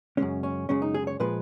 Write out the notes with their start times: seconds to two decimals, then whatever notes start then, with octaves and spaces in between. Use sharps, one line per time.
0.17 F#2 C#3 G#3 C#4
0.43 C#4
0.69 F#2 C#3 G#3 C#4
0.82 D#4
0.94 G#4
1.07 C#5
1.20 A#2 F3 G#3 B4